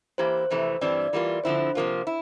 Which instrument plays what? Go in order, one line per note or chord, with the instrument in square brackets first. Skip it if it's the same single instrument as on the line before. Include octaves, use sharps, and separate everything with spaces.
[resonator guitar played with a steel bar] E3 A#3 E4 G4 [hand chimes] C5
[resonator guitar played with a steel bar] F2 C3 E3 A3
[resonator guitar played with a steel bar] G2 E3 G3 C4 [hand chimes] D5
[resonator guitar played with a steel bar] E3 G3 A#3 F4
[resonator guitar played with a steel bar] D3 F3 C4 E4 [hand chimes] C5
[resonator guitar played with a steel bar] C3 F3 A#3 F4
E4